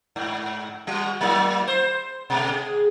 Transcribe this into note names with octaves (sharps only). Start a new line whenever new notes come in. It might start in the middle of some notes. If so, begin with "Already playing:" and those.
G#2
G3 F#4
F#3 A#3 E4
C5
B2 A3
G#4